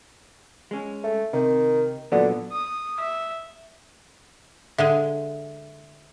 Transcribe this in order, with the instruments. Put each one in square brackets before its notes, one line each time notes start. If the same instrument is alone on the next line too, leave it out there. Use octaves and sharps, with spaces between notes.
[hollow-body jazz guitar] G#3 C#4
[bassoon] A3
[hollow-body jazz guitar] C3 [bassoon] D#3
[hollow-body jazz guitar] A#2 F#3 B3 [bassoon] D3
[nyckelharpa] D#6
E5
[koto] D3 G#3 G#4 [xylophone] E5